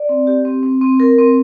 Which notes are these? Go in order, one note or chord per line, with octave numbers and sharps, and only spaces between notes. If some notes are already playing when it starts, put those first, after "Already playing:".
Already playing: D5
C4
G4
C4
C4
C4
A#4
C4